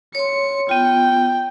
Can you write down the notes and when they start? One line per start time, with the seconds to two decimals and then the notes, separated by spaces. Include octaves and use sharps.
0.15 C#5 C6 C#7
0.69 B3 F4 G5